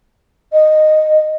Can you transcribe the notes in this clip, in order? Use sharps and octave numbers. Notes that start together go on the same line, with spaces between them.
D#5